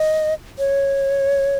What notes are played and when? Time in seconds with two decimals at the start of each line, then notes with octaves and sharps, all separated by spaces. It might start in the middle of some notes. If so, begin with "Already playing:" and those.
Already playing: D#5
0.58 C#5